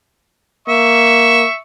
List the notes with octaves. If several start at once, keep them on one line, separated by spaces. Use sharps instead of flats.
A#3 E5 C#6